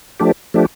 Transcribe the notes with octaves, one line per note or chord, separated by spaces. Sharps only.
F3 A3 D4 G4
F3 A3 D4 G4